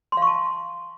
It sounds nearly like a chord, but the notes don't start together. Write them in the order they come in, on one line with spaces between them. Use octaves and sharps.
C6 F5 C#6 A5